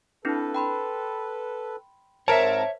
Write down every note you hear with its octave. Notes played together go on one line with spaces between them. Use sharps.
C4 D4 E4 A4 B4
G5 B5 C6
G#2 C4 A#4 C5 C#5 E5 A5